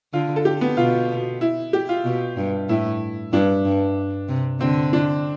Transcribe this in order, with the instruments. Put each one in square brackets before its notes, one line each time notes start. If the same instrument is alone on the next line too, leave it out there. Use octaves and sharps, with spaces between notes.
[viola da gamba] D3 [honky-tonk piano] F4
[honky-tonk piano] A4
G4
B3
[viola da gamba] B2 [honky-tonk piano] F4
[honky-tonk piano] E4
G4
F4
[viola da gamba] B2
G2
[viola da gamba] A2 [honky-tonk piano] E4
[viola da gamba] G2 [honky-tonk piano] D4
[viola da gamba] G2
C3
[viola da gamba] D3 [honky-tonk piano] C4
[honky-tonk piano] D4